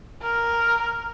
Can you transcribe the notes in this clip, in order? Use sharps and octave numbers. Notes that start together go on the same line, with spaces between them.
A#4